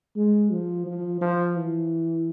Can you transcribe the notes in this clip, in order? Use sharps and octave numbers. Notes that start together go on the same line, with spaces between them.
G#3
F3
F3
F3
E3